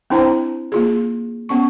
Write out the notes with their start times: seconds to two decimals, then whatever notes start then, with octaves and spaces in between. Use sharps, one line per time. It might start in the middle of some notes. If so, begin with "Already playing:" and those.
0.10 C4 D4 E4 C5 G5 A#5
0.72 A#3 F4 G#4
1.49 B3 C#4 C#6